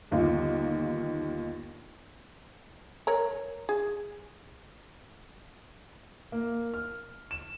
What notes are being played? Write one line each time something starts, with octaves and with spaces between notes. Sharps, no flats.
G1 D#2 D#4 F4
A#4 C#5 A#5
G#4
A#3
F6
E7